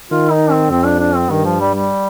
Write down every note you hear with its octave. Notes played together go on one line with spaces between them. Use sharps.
D#3 F4
D#4
C4
F2 C4
D4
D4
C4
G2 D#3
F3
G3
G3